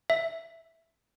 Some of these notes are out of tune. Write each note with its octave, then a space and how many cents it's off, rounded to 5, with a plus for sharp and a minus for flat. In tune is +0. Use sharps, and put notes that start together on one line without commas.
E5 +0